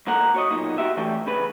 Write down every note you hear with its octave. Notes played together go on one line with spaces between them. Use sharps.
G2 A#2 A#3 A4 F#5 A#5
F#4 C#5 D#5
B1 A#2 D#4
F#4 G4 E5
E3 G3 A3 C#4 G5
E2 C#3 B4